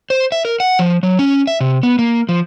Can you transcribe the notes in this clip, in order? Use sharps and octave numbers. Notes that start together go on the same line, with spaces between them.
C5
E5
A#4
F#5
F3
F#3
C#4
E5
C3
B3
A#3
F3